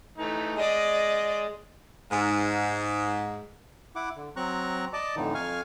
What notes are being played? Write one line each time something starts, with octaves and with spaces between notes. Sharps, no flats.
E3 A3 D#4
G#3 D5 D#5
G#2
E4 F#5 D6
D3
F#3 C4 A#5 C#6 F#6
D5 D#5 A5 D6
F2 A2 D3 E3 D#4
F2 F5 G#5 C#6 F6